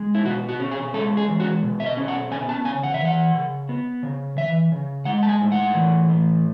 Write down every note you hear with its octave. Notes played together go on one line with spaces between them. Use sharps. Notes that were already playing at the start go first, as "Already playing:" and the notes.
Already playing: G#3
E4
B2 F#4
F#4
C#4
G#4
G#3 A4
G#4
E2
F#4
B2
E5
D#5
C#4
F#5
B3 G#5
A5
C#3 G#5
F#5
E5
E3 F#5
C#3
B3
C#3
E3 E5
C#3
G#3 F#5
A5
G#5
A2
F#5
E3
A2